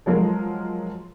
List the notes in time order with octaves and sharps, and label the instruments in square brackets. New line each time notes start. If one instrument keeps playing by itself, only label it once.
[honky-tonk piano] F3 F#3 G#3 F4 A#4